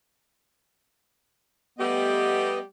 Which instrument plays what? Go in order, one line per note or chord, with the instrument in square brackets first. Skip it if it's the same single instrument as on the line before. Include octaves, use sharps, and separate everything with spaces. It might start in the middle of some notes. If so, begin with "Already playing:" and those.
[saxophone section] G3 A3 G4 [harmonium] B3 D#5